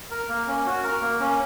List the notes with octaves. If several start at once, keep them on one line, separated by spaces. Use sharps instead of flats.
A#4
A#3
C#4
F#4
A#4
A#3
C#4